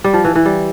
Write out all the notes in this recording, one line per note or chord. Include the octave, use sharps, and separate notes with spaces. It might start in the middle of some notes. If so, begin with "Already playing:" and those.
G3
F3
E3
E3
G3